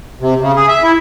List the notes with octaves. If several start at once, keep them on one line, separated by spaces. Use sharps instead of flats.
C3
C#3
G#4
E5
E4